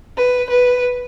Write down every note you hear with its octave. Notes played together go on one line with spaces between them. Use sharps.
B4
B4